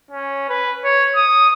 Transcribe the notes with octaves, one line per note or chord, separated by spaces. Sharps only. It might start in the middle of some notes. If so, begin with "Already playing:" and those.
C#4
B4
C#5
D#6